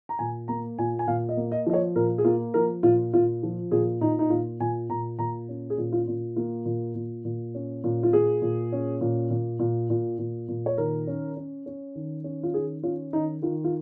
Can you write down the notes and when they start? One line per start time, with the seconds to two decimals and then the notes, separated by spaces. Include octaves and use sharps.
0.09 A#5
0.19 A#2 G#5
0.48 A#3 A#5
0.79 A#2 G#5
0.99 G#5
1.07 A#2 F5
1.29 D#5
1.37 A#3
1.52 D#5
1.66 F3 D#5
1.74 C#5
1.96 A#2 A#4
2.18 G#4
2.25 A#3 F4
2.54 F3 A#4
2.83 A#2 F4
3.13 A#2 F4
3.43 F3
3.71 A#2 G#4
4.01 A#2 D#4
4.19 D#4
4.30 A#2 F4
4.60 A#2 G#5
4.90 A#2 A#5
5.19 A#2 A#5
5.49 C#4
5.70 G#4
5.78 A#2
5.92 F4
6.08 A#2
6.36 A#3 F4
6.65 A#2
6.95 A#2
7.25 A#2
7.55 C#4
7.84 A#2
8.03 F4
8.13 A#2 G#4
8.42 A#2
8.72 C#4
9.01 A#2
9.30 A#2
9.59 A#2
9.90 A#2
10.19 A#2
10.48 A#2
10.66 C#5
10.78 D#3 A#4
11.07 C#4
11.37 C#4
11.66 C#4
11.95 D#3
12.24 C#4
12.43 F4
12.54 D#3 G#4
12.83 C#4 F4
13.13 D#3 D#4
13.42 D#3 F4
13.64 F4